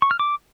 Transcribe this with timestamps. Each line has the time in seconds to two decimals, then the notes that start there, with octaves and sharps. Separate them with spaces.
0.02 C#6
0.11 F6
0.19 D6